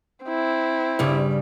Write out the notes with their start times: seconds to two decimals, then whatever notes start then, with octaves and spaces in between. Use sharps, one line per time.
0.25 C4 E4
0.99 G2 C#3 G3